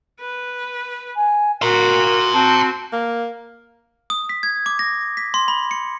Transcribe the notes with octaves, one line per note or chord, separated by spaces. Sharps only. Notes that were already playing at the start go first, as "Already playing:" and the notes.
B4
G#5
F#4 A#4 A#5 C6
C4 F#4 A5
A#3
D#6
B6
G#6
D6
A#6
B6
C6
B5
C#7